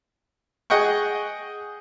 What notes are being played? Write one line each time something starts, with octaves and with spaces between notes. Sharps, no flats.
G#4 D#5 F#5 G5 C#6